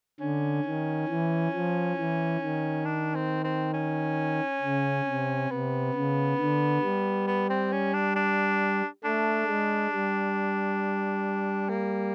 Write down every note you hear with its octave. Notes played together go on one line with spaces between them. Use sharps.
D3 C#4
D#3
E3
F3
E3
D#3
D4
C4
C4
C#4
C#3
C3
C3 B3
C#3
D3
G3
B3
C4
C#4
D4
D4
A3 D4
G#3
G3
A#3